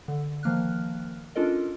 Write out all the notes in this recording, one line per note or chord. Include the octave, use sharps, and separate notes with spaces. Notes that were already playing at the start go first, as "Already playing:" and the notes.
D3
D#3 F3 A#3 F6 F#6
C#4 D4 F4 A4 A#4 D#5